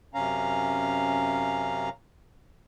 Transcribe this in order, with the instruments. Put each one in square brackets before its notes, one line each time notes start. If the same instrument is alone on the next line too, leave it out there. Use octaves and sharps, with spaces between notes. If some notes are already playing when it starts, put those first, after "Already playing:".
[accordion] F#2 C3 C#4 F5 A#5